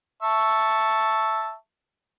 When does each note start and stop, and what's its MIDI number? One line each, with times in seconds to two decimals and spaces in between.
0.22 1.54 76
0.22 1.54 81
0.22 1.54 85